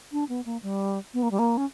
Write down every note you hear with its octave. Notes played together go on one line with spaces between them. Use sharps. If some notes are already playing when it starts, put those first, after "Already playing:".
D4
B3
A#3
G3
B3
A#3
G3
A#3
C#4